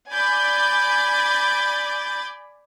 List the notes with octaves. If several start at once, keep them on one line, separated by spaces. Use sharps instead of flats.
D5 G#5 B5 D6 G6 A6